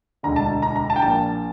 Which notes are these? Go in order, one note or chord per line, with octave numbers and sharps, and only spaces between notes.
E1 D2 D3 A#5
A5
A#5
A#5
A5
G5
A#1 A#2 A5